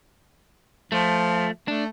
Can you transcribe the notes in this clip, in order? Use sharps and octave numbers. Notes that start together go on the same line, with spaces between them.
F3 A3
A3 D4